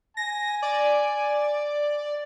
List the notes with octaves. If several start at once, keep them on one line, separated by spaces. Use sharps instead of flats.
G#5 A#6
D5